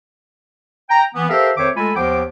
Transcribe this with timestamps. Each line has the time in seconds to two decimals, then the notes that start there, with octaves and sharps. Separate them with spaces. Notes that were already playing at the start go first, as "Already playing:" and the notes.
0.89 G5 A#5
1.15 E3 B3
1.30 G4 A4 A#4 C5 E5 F5
1.57 F2 D#3 C5 C#5 E5 D6
1.77 G#3 A3 F4 A4 G#5 B5
1.96 D#2 F3 B3 C5 G5 D6